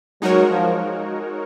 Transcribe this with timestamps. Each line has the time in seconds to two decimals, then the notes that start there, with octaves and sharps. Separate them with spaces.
0.22 F#3 G#3 D#4 F#4 A#4 C#5
0.50 F3